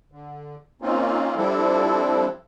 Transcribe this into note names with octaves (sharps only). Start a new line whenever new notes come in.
D3
A#3 C4 C#4 D#4 F4
F3 G3 C4 D4 E4 A4